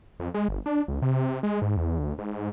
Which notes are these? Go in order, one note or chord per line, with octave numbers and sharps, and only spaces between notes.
F2
G#3
G1
D4
C#2
C3
C3
G#3
G#2
E2
D2
G#2